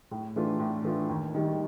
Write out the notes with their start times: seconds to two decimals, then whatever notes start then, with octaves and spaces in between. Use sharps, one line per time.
0.11 A2
0.36 E3 A3 D4 F4
0.59 A2
0.84 E3 A3 D4 F4
1.09 D#2
1.35 D#3 G3